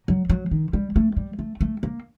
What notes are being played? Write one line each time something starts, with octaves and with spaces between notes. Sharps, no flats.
F#3
F#3
D#3
G3
A3
G3
A3
A3
A#3